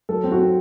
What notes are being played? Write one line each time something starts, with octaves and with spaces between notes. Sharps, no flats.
F#3 A4
C4
F#4
C4